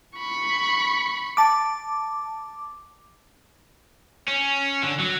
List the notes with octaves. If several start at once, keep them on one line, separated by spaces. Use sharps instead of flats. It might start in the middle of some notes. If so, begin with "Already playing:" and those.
B5 C#6
A5 D6
C#4
D3
F#3